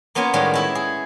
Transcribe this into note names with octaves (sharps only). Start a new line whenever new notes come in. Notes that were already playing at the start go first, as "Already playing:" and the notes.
A#3 B3 C#4 F4 G#5
A2 D#3 G3 G#3
G#3 E4 E5
G#4